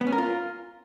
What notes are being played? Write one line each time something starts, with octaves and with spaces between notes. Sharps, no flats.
B3
C#4
A#4
F4